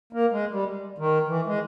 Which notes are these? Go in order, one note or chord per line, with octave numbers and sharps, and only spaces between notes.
A#3
G#3
G3
D#3
E3
G#3